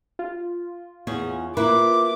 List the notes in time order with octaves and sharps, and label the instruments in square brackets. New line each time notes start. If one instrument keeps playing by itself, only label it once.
[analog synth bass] F4
[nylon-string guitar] E2 C#4 G#4
[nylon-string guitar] A#3 E4 B4 [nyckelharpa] D6